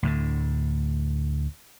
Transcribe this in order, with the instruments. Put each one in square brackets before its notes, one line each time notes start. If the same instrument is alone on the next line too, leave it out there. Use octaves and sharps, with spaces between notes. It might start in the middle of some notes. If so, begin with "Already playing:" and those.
[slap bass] D2 A2 D3